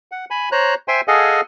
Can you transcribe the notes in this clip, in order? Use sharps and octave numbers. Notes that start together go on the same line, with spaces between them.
F#5
G#5 B5
C5 C#5 A#5 F#6
C5 E5 G5 G#5 C6
G#4 A4 D#5 F5 F#5 G#5